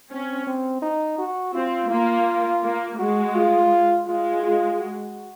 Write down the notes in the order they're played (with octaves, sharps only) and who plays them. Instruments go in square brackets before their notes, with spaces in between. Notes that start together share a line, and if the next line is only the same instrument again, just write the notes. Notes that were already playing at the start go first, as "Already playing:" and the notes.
[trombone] C4 [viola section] C#4
[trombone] C4
D#4
F#4
[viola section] C4 [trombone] F4
[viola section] A#3 [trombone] F4
[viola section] A#3
[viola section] G#3 [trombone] F#4
[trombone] F4
[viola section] G#3 [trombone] F4
[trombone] F4
F#4